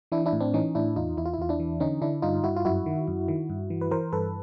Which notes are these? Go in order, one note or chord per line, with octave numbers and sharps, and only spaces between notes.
E3 D4 E4
D4 E4
A2
C4 D4
E3 C#4 D#4
A2 D4 E4
E2 D#4 F4
E2 E4
F4
E4
E2 F4
D4 E4
E3
D3 C#4 D#4
D3 D4 E4
G2 D#4 F4
G2 E4 F#4
F4
F#2 E4 F#4
D#3
F#2
D#3
G2
E3
B4
E3 A#4 C5
G2 A4 B4